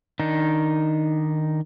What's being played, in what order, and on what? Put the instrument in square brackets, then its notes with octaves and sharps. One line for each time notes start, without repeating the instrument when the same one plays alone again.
[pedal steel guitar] D#3 D4 D#4